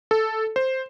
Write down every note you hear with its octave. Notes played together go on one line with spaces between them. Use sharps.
A4
C5